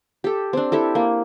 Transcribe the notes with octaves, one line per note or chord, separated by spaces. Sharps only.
G4 A4
C4 D4
E4 G4 A4
A#3